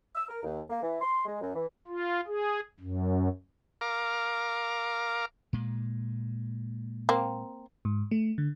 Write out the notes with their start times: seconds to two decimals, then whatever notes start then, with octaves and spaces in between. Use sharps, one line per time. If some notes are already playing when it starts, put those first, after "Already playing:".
0.15 E6
0.29 A#4
0.43 D#2
0.70 A#3
0.82 E3
1.01 C6
1.26 G#3
1.41 F#2
1.55 E3
1.87 F4
2.27 G#4
2.80 F#2
3.81 A#4 F5 D6
5.53 A#2 G#3
7.09 A#3 C4
7.85 G#2
8.11 A3
8.38 D3